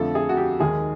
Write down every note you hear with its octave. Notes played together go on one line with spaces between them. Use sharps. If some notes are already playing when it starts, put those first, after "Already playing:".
Already playing: F2 D3 F3 A3 A4
G#4
F#4
G4
D#2 D#3 G#3 G#4